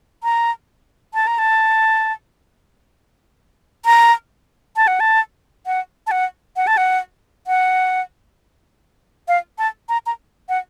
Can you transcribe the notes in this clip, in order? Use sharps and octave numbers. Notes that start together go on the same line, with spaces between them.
A#5
A5
A#5
A5
A#5
A5
F#5
A5
F#5
A5
F#5
F#5
A5
F#5
F#5
F5
A5
A#5
A#5
F#5